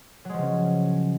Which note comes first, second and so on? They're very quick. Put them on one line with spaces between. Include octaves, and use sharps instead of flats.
F#3 G#3 F3 C#3 C#4